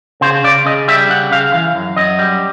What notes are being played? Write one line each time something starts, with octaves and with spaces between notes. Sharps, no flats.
C#3 C5
C#3 D5
C#3 D#5
G3 E5
C#3 F#5
C#3 F5
E3 F5
F#2
F#2 D#5
G3